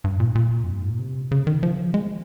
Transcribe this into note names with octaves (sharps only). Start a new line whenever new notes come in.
G2
A#2
A#2
F2
G2
G#2
A#2
C3
C#3
D#3
F3
G#3